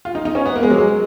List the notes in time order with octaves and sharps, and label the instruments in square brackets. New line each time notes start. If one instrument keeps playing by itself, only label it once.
[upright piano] F4
D#4
D#4
C#4
B3
A#3
G#3
F#3
G#3